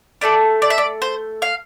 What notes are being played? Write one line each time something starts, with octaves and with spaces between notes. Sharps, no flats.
A3 D4 A4 D5
D5
E5
D5
C5
F5